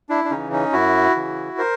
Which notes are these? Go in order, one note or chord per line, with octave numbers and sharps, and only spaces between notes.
D4 E4
D4
C#3 E3 C#4 D#4
C#4 D#4
F#2 E4 F#4
C#3 E3
A#4 C5